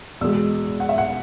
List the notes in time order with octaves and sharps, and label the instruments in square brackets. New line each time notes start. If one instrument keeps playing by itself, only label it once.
[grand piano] E2 B2 G#3 E6
F#5
E5
F#5